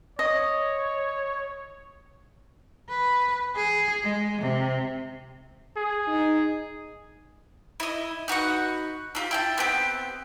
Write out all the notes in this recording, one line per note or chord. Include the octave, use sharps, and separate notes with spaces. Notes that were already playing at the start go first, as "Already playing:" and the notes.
C#5 D#5
B4
G#4
G#3
C3
G#4
D#4
E4 D#5
D#4 F#4 B4 F#5
D4 F4 G4
E4 G5 A5
B3 C4 G4